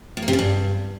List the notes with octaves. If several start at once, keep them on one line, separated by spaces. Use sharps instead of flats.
A2
A#3
C3
C#3
G2